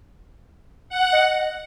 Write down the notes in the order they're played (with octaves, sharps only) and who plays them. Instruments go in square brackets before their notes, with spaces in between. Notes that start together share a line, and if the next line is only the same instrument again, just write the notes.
[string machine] F#5
[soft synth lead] D#5